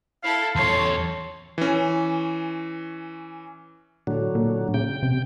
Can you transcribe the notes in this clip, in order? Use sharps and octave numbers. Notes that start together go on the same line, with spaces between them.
E4 A4 F5
E2 A4 C#5 C6
E3 C#4
A2 D3 F#3
A#2
C#3 G5
C3